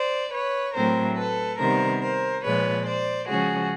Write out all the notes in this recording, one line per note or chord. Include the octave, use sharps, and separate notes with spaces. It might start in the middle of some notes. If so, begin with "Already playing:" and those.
Already playing: C5 D5
B4 C#5
A2 F#3 A3 C4 A#4 C5
A4 B4
C3 D#3 G3 B3 A#4 C5
A#4 C5
A#2 F3 G#3 B4 C#5
C5 D5
C#3 F3 G#3 C#4 F#4 G#4